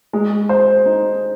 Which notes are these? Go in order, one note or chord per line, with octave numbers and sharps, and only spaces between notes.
G#3
C5
D#4